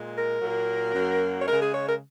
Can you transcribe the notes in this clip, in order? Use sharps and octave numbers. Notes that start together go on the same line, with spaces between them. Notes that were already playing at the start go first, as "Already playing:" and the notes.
Already playing: A#2 G#3
A#4
A#2 F#3 A#3
F#2 F#3 A#3
C#5
C#3 G#3 A#4
G#4
C#5
A#4